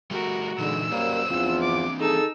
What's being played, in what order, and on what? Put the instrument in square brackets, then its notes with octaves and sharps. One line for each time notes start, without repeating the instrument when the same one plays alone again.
[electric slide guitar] G3 A3 [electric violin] F#4 A#4
[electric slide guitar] A#2 E3 D#4 [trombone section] D3 G#3 [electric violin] E6
[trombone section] F#2 G3 A#3 [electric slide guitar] A#4 C5 C#5
[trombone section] E2 F3 F4 [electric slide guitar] E3 C4 D4
[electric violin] D6
[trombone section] D#3 G#4 A4 [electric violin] D#4 E6